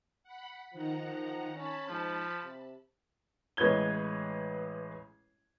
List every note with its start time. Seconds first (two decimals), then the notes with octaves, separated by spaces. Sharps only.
0.24 F#5 B5
0.73 D#3 F3 F#5 A#5
1.55 C#4 A5 B5
1.89 G#2 F3
2.43 C3
3.57 A1 G#3 B4 C#5 G#6 G7